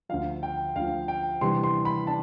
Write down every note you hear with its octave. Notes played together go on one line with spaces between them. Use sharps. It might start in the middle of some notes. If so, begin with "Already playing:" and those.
D2 D3 F3 F5
G5
D2 D3 F3 F5
G5
C3 E3 G3 B3 D4 C6
C6
B5
D4 A5